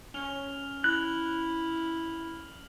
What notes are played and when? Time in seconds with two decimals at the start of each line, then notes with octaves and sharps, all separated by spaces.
0.14 C#4 F6 F7 G7
0.84 E4 F#6 F#7